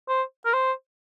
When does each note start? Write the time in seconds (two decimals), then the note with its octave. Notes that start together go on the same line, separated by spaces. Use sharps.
0.09 C5
0.46 A#4
0.54 C5